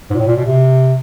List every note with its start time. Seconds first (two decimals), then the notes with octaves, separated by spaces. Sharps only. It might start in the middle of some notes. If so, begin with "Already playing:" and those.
0.10 G#2
0.15 A#2
0.19 A2
0.27 A#2
0.36 B2
0.45 C3